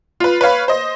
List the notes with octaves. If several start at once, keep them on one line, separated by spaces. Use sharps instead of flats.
F4 B4
B4 C#5 F5 B5
C5 D#5